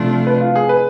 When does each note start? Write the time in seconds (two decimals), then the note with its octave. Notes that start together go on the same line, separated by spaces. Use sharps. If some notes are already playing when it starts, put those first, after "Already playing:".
Already playing: C3 F3 A3 D4 F4
0.27 B4
0.41 F4
0.56 G#4
0.69 B4